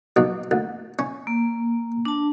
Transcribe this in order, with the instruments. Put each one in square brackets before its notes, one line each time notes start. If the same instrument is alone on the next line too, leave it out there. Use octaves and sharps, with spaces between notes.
[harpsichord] B1 B2
D2
C#4
[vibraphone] A#3
D4 A5